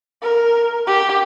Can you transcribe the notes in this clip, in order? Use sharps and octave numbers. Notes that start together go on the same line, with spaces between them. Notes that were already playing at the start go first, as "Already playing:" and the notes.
A#4
G4